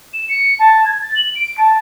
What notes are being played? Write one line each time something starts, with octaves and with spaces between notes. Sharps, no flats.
E7
C#7
A5
G#6
A6
F#7
D7
A5